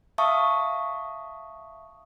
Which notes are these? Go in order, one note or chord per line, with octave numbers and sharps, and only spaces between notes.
E5 F5 A5 C#6 D#6